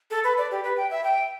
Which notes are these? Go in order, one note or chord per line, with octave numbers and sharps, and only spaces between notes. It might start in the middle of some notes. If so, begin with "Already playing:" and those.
A4
B4
D5
G4
B4
G5
E5
G5